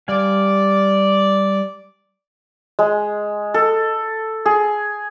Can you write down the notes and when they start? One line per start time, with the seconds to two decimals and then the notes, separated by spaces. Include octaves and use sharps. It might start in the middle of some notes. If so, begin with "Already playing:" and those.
0.08 G3 D5 F5 G#5
2.79 G#3
3.54 A4
4.46 G#4